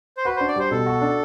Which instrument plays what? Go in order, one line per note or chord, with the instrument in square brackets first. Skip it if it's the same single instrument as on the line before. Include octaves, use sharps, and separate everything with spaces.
[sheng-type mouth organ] C5
[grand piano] F#4 [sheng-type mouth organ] B4
[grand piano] D4 [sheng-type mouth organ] C5
[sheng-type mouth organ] D5
[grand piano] G3 [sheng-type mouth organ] C5
[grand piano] B2 [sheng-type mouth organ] A4
[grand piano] F#4
D4